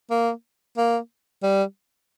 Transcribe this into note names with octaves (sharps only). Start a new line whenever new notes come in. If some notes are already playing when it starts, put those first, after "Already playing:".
A#3
A#3
G3